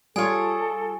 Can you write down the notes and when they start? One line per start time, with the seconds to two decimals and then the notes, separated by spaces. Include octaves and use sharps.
0.16 G3 F4 G#4 A4 C#5 G#5